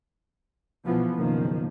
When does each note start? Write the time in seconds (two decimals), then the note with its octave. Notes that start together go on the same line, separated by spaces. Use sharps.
0.85 B1 E3 F3 B3
1.15 F#1 B2 D#3 F3 A#3